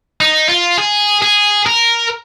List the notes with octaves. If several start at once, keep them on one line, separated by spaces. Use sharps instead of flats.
D#4
F4
G#4
G#4
A#4